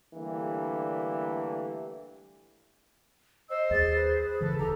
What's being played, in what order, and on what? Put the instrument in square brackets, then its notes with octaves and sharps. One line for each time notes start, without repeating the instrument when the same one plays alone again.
[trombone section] D3 E3 G3 A3 A#3
[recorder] C5 [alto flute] D#5 [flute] E6
[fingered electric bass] D#2 [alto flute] G#4 [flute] A6
[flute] B4
[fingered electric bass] C#3 E3 [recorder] A4
[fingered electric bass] D#1 D#3 [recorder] G4 [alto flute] A4 [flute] A#5